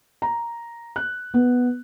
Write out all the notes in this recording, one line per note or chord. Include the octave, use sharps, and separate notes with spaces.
A#5
F#6
B3